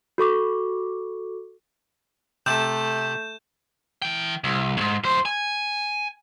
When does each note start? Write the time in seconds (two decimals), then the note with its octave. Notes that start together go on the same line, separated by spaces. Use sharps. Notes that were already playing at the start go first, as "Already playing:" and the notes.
0.18 F#4 A4 C#6 D6
2.46 C3 A3 A5 G6 E7
4.02 E3 G5
4.44 C2
4.77 D#2 G#2
5.04 F#2 C5
5.25 G#5